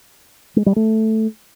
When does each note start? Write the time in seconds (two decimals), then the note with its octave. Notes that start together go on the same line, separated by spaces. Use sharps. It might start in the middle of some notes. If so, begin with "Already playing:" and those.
0.56 G#3
0.66 G3
0.76 A3